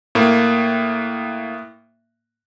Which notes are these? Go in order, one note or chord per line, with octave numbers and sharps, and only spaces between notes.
A2 A#3